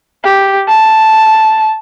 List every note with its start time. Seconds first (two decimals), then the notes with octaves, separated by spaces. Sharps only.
0.24 G4
0.68 A5